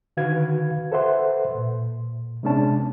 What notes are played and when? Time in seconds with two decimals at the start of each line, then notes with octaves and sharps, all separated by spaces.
0.17 D3 D#3 F#4 B4 F5 G#6
0.92 A4 B4 C5 E5 F#5 C6
1.55 A#2
2.43 C3 G#3 B3 C#4 D4 A5